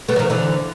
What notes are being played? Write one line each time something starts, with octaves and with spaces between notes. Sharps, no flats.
A3 B3
F#3
D#3 F3
D3 E3